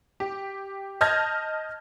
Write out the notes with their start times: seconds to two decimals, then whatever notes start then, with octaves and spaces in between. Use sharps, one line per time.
0.20 G4
1.01 D#5 A5 F6 G6 G#6 A#6